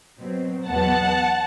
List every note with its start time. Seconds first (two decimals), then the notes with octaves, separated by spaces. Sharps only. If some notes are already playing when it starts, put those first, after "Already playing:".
0.18 B2 F#3 C4
0.66 E2 B2 F#3 B3 F#5 A5